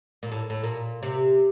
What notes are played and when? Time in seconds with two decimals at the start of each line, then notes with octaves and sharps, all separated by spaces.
0.23 A#2
0.32 A2
0.50 A2
0.63 A#2
1.03 C3